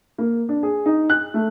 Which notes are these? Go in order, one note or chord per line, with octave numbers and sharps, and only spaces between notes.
A#3
D4
G#4
D#4
F#6
A3